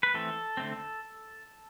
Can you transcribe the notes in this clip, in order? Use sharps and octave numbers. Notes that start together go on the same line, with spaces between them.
B4
E3 A3 C4 A4
D3 A3 C4